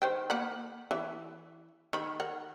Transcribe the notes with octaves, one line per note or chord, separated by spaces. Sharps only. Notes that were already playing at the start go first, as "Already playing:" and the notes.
D#3 C5 G5
A#3 F#5 B5
E3 E4
D#3 B5
A#4 F#5